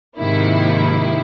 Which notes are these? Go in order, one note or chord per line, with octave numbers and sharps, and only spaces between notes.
G#2 C3 D#3 F3 A#3 E4